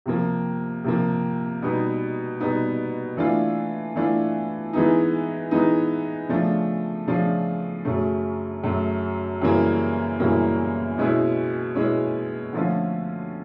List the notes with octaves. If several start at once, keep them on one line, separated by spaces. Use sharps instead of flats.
C3 F3 A#3
C3 F3 A#3
B2 G3 B3 D#4
B2 G3 B3 D#4
E3 A3 D4 F4
E3 A3 D4 F4
E3 G#3 B3 D#4
E3 G#3 B3 D#4
C#3 F3 A3 D4 F4
C#3 F3 A3 D4 F4
F#2 C#3 F#3 A3
F#2 C#3 F#3 A3
F#2 C#3 E3 G3 A#3
F#2 C#3 E3 G3 A#3
B2 G#3 C#4 E4
B2 G#3 C#4 E4
D3 F3 A3 C#4 F4